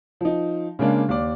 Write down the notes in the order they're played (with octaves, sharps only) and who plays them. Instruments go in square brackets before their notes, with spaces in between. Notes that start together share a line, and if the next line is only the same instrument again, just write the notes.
[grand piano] F3 D#4
C#3 G#3 A#3 D4
D#2 D5